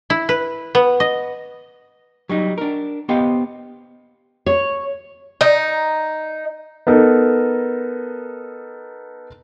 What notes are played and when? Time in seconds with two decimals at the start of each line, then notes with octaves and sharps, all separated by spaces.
0.10 E4
0.29 B4
0.75 B3
1.00 D#5
2.29 F#3 G3 D#4
2.58 D4 A#4
3.09 B3 G4 C5 D#5 F5 G5
4.46 C#5
5.41 D#4
6.87 B3 D#4 A4 A#4